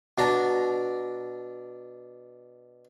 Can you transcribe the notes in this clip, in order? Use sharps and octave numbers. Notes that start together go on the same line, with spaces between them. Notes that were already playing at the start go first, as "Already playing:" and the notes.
B2 D4 A#5